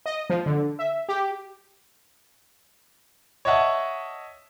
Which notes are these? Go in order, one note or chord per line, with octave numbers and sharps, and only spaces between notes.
D#5
F3
D3
E5
G4
C#5 D#5 E5 F#5 A5